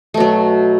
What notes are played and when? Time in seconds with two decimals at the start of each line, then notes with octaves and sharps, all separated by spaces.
0.14 A3
0.17 B2
0.20 F#3